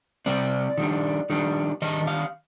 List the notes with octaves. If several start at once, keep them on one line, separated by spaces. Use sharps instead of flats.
C3 G3 C4 D5
D#3 G3 D4
D#3 G3 D4
D#3 G3 D4 D#5
F5